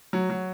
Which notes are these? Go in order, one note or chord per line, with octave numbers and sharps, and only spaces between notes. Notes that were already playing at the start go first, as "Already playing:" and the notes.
F#3
F#3